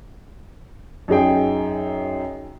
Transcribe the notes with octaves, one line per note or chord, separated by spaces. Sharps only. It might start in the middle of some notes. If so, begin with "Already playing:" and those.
F#2 D#4 G#4 G5